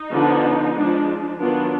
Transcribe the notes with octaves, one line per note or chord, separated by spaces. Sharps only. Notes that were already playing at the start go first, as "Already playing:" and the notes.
Already playing: D#4
D3 F3 B3 D4
F3 G#3 D4
D#3 F#3 B3 D4 F4